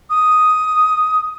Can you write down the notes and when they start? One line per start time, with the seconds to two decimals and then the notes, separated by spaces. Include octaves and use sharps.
0.10 D#6